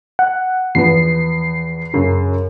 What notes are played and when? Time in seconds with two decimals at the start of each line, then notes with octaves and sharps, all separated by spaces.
0.19 F#5
0.75 E2 F3 B3 C7
1.94 F#2 C#3